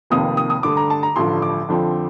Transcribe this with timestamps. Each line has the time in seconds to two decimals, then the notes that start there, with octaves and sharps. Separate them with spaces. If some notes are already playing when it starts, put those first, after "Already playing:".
0.10 F1 F2 C3 D#3 A#3 D#6
0.37 D#6
0.50 D#6
0.63 G2 D3 A3 D6
0.77 A#5
0.90 A5
1.03 A#5
1.16 A1 G2 D3 F3 C6
1.42 D6
1.69 F2 D3 F3 C4